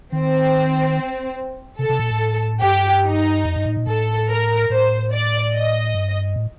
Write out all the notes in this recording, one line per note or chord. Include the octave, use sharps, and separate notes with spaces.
D#3 C4
C3 A4
C3
A#2
A2
G2 G4
D#4
F2
G2
A2
A#2
A2 A4
A#4
A2 C5
D5
D#5
G2
A2